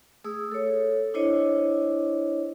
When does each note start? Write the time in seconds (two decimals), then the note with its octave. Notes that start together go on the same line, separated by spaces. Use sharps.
0.24 A3 G#4 D#6 E6
0.52 A4 C#5
1.14 D4 E4 C5 C#5 D#5